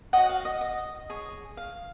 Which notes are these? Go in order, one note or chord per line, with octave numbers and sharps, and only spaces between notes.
F#4 C#5 D#5 F#5
F5
D#5
D#5
G#4 C#5
F5